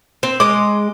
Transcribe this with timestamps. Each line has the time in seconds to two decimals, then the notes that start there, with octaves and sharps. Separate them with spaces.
0.23 C4
0.40 G#3 D#5 D6